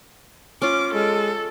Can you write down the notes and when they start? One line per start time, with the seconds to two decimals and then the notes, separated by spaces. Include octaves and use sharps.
0.62 C#4 F4 D6
0.94 G#3 A4